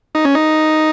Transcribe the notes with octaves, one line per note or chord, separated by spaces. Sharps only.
D#4
C#4
D#4